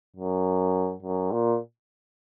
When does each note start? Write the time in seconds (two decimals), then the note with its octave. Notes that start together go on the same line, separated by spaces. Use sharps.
0.16 F#2
1.02 F#2
1.31 A#2